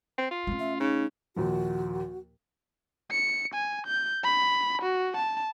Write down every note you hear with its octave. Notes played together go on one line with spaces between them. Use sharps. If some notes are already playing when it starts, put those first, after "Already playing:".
C4
F4
A3 C#4
E5
C#3 D#4
D#2 A#2 F3 F#4
C#7
G#5
G6
B5
F#4
A5